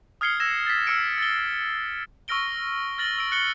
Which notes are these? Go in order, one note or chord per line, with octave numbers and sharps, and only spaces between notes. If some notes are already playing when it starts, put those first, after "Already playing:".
D#6 F6 G#6 C7 C#7 G7
E6 G#6 A#6 E7
A6 B6
E6 F6 C#7 D7
A6 G7
C#6 E6 F6 A#6 D7 G7
F6 A6 A#6 F#7 G7
E6 D7
F#6 C#7 D7 G7